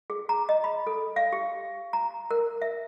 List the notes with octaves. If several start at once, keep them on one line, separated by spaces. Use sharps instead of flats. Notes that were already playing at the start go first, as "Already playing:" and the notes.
G#4
A#5
D#5
B5
A4
F5
G4
A#5
A#4
E5